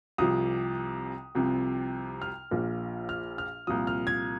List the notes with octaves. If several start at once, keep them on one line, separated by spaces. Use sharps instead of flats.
C2 C3 F3 D#6
C2 C3 F3
F6
A#1 A#2 F3
F6
F6
C2 A#2 F3 D#6
F6
G#6